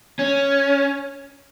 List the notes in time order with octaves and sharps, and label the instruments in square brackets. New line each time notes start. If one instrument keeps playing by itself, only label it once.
[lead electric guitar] C#4